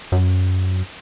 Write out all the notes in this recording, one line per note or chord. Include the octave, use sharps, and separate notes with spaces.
F#2